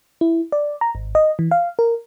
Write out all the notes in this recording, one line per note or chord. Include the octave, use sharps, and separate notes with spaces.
E4
D5
A#5
G#1
D#5
E3
F5
A#4